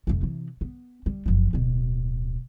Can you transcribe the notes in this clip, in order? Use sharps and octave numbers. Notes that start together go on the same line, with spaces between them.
F1 A3
C3 E3
B3
G3
F#1 F3
D1 B2